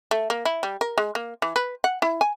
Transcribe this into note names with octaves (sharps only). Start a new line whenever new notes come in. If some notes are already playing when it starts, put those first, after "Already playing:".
A3
A#3
E4
G3
A#4
G#3
A#3
E3
B4
F#5
E4
G#5